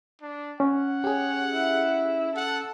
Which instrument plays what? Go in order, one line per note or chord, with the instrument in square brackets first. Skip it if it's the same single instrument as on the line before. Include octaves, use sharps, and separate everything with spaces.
[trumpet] D4
[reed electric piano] C#4 [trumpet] F#5
[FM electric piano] G4 G#4 [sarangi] C#5
[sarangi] E4
[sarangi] A4 [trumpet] F#5